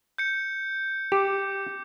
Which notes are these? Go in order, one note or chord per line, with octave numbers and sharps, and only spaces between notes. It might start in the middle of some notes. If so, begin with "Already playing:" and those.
G6 C#7
G4 D6